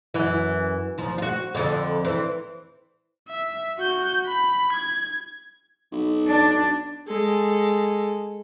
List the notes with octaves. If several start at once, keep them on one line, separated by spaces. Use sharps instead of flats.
F#2 E3
D#2 F3
F4 F#4
F2 D3
E3 C4
E5
F#4 G6
B5
G#6
B1
D4
G#3 A4